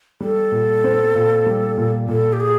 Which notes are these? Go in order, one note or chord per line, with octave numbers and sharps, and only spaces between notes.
G3 A4
A#2
C4
A#2
G3
A#2
A#2 A4
G4
G#4